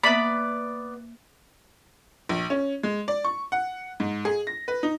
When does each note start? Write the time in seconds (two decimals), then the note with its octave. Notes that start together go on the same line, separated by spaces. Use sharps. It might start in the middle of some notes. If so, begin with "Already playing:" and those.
0.03 A#3 B3 D5 E5 B5
2.29 A#1
2.50 C#4
2.83 G#3
3.08 D5
3.24 C#6
3.52 F#5
4.00 G#2
4.25 G#4
4.47 A#6
4.68 B4
4.83 D#4